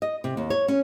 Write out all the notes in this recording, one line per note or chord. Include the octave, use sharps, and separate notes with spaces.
D#5
C3
D#2
C#5
C#4